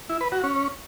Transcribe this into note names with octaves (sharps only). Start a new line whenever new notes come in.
E4
B4
F#4
C#4